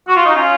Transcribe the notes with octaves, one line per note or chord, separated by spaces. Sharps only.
F#4
F4
D#4
C#4 F4